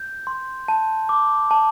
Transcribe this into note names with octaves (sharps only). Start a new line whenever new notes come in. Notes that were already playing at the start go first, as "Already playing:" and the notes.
Already playing: G6
C6
A5
D6
A5